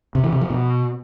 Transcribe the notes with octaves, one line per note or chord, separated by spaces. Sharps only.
C3
E3
C3
F3
B2